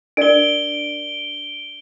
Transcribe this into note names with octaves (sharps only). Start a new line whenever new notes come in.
D4 A#4 D5 D7 G7